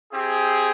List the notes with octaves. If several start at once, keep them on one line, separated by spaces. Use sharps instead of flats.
C4 E4 G4 G#4